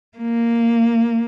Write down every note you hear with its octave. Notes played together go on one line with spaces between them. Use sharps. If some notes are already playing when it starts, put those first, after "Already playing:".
A#3